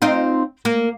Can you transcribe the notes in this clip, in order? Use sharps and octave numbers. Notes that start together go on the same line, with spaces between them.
C4 D#4 F4
A#3